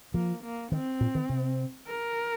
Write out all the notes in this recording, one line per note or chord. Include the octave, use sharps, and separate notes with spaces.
F3 A#3
A#3
D#3 C4
A#2
D#3
C3
A#4